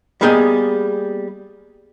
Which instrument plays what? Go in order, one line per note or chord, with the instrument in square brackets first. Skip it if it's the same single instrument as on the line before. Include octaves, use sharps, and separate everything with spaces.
[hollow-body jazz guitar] G3 A#3 B3 G#4 D#5 G5